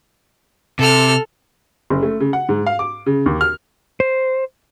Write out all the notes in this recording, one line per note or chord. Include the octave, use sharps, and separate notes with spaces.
C3 A4 F6
F#1
A3
C#3
F#5
G#2
F5
D6
C#3
D#2
F6
C5